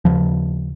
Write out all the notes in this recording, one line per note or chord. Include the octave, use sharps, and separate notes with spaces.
D#2 C#3 F3